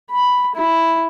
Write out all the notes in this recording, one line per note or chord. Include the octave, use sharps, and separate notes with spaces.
B5
E4